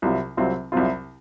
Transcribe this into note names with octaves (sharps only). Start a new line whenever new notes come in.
C2 C3 F#3 C4 F4
C2 C3 F#3 C4 F4
C2 C3 F#3 C4 F4